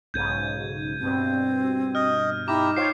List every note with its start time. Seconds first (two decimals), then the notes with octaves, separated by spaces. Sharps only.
0.14 B1 G#2 C#3 G6 G#6 D#7
1.00 G2 B2 C4
1.95 D#5 F6
2.48 D#4 E4 G4 A#5 D6
2.77 F4 C5 C#5 G5 D6 C7